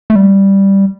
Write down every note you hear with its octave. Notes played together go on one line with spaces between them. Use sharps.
A3
G3